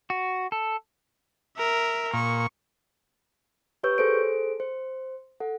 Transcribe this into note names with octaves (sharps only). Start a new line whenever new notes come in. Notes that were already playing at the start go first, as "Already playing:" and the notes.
F#4
A4
A#4 E5
A#2 C#6
G4 B4 C#5 C#6 E6 G6
G#4 A4 C5 D7
C5
A4 F#5